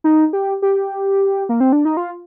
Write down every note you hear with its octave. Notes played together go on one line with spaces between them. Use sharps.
D#4
G4
G4
A#3
C4
D4
D#4
F4